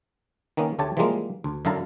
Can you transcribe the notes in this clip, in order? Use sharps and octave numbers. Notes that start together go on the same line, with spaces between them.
D#3 A#3 B3 C#4
D2 A3 G4 C#5 A5
E3 F3 G3 G#3 A#3
D2
F#2 D3 E4 F5 A5 A#5